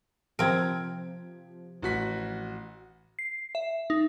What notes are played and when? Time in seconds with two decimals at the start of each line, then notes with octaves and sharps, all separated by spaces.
0.39 C3 F3 C4 A#4 G#6 D7
1.82 A1 F#4 B6
3.19 C7
3.55 E5
3.90 D#4